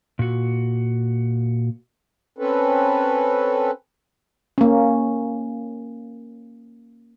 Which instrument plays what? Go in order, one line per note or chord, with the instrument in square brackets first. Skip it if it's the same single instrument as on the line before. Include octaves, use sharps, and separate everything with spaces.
[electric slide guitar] A#2 F#4
[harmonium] C4 C#4 A4 B4
[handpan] A#3 C#4